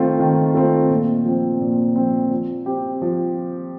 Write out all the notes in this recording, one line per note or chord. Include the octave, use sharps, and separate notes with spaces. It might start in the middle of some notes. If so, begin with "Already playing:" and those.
Already playing: D#3 A3 C4 F4
D#3
A3 C4 F4
A#2
F3 C4
A#2
F3 C4
F3
C4 G4
F3